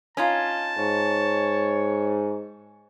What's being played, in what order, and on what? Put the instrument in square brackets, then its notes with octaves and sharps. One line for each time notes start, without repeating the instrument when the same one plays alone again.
[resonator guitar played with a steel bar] C#4 D#4 F4 [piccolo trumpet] A5
[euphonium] G#2 [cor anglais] C#5